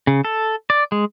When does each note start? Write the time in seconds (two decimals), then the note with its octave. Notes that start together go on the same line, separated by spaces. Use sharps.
0.07 C#3
0.25 A4
0.70 D5
0.92 G#3